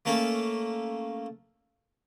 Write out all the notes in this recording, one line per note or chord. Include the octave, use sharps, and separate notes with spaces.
A3 A#3 C#4 A4